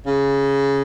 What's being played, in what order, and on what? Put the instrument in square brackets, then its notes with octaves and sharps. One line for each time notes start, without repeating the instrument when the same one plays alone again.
[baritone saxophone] C#3